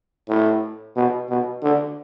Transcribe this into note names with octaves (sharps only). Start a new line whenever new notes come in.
A2
B2
B2
D3